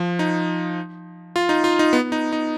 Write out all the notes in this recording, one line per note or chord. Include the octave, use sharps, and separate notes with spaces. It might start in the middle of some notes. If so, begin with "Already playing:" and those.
Already playing: F3
D#4
F4
D#4
F4
D#4
B3
D#4
D#4